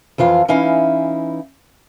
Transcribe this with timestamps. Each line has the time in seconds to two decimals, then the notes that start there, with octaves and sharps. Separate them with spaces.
0.18 F2 E3 F4 F5
0.48 E3 C#4 D#4 E4 F5